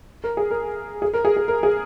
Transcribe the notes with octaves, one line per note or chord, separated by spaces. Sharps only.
A#4
G#4
A#4
G#4
A#4
G#4
G#4
A#4
G#4